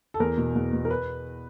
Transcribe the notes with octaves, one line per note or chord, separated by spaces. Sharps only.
A4
E2 A#4
B2
E2
B2
A#4
B4